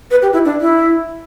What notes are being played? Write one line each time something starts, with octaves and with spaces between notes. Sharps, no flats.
B4
G4
E4
D4
E4